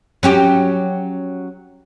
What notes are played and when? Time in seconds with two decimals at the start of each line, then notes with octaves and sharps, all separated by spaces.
0.23 F#3 C#4 G4